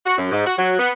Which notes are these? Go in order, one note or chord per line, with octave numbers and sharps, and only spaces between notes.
F#4
F#2
G#2
F#4
F#3
B3